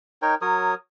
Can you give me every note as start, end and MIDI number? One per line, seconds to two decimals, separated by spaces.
0.22 0.35 63
0.22 0.35 70
0.22 0.35 73
0.22 0.35 79
0.42 0.74 54
0.42 0.74 70
0.42 0.74 73
0.42 0.74 87